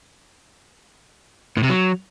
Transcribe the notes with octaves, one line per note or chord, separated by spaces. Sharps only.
A2
C3
F#3